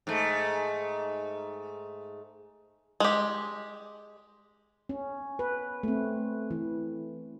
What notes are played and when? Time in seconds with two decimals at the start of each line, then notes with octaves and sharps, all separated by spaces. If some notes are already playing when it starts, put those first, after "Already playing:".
0.07 G#2 A3
3.00 G#3 G4
4.89 C#4
5.39 B4
5.83 A3 C4
6.51 E3